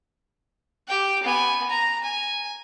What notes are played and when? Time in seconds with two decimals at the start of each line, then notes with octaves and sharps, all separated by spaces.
0.88 G4 G5
1.23 B3 G#5
1.70 A#5
2.04 G#5